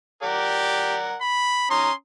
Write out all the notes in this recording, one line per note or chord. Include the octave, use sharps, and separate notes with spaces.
G4 A#4 D5 F#5
B5
C#4 A#5 C6 D#6